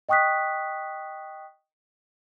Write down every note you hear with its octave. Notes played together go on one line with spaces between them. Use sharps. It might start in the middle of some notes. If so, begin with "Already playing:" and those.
D#5 G5 C#6 D#6 F#6 B6